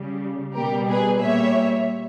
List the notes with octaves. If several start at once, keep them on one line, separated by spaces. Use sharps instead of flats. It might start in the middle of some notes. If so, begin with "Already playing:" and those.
Already playing: C#3 G3
B2 G3 G4 A#4
G#4 B4
A#2 G3 C#5 E5